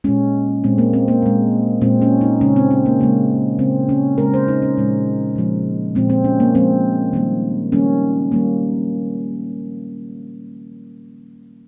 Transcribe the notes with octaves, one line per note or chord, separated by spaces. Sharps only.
A#2 G#3 C#4
A#2 G#3 C4
A#3
C4
A#3
A#2 G#3
A#2 G#3 C4
C#4
D#4
C#3 G#3 C#4
C4
C4
A#3
C#3 G#3 A#3
C#3 G#3 C4
C#4
C#3 G#3 A#4
C5
D#4
C#4
A#2 F3 G#3
A#2 F3 G#3
A#2 F3 G#3 C4
C4
C#4
A#3
A#2 F3 G#3 C4
D#3 G3 A#3
D#3 G3 A#3 C#4
D#3 G3 A#3